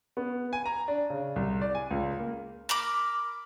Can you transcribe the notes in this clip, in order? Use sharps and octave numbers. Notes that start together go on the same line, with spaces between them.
B3
G#5
A#5
D4
C#3
C2
D5
G#5
C#2
A#3
A#4 B5 D6